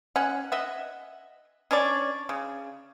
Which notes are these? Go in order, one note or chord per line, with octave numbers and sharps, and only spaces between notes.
C#4 F#5
D#5 E5 F#5
C#4 D4 C#5 D5
C#3